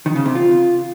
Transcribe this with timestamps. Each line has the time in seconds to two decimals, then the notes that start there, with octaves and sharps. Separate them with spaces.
0.06 D#3
0.16 C#3
0.26 C3
0.35 F4